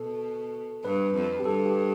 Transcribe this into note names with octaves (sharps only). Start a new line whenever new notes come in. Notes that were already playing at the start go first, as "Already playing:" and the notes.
Already playing: B2 A4
G2 B4
F2
G4
G2 A4
G4